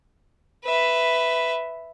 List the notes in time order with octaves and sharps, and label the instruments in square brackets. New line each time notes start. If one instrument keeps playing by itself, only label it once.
[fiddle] B4 E5